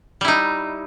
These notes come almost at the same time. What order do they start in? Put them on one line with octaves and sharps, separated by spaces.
G3 E4 D#4